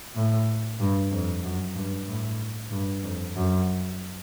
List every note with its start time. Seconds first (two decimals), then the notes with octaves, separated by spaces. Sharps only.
0.15 A2
0.80 G2
1.11 F2
1.43 F#2
1.76 G2
2.08 A2
2.71 G2
3.03 F2
3.36 F#2